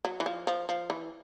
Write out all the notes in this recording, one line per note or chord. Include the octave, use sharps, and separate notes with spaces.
F#3
E3
F3
F3
F3
E3